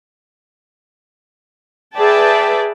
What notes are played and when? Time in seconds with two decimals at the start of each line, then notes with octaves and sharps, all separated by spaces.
1.96 G#4 B4 D5 E5 G5 A5